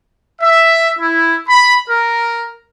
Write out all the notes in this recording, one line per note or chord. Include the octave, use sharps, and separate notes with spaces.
E5
E4
B5
A#4